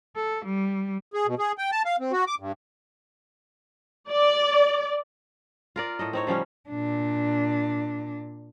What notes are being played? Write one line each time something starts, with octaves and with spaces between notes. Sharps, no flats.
A4
G3
G#4
B2
G#4
G5
A5
F5
C4
F#4
D6
G2
D5
F4 A#4 D5
A2 A4 D#5
C4 D#4 C#5
C#3 F3 G3 C#4
A#2 D4